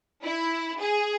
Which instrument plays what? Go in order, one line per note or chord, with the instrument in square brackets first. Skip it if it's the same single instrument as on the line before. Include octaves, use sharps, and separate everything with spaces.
[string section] E4
G#4